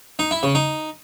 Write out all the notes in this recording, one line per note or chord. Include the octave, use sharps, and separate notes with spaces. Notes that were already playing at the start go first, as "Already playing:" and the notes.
D#4
E4
C#3
D#4